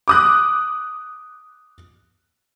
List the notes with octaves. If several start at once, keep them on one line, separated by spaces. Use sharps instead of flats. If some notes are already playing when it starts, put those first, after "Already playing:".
D6 D#6 F#6